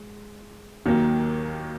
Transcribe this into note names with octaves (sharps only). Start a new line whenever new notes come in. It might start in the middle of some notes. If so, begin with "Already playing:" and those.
Already playing: G#3
D#2 D#3 F#3 A#3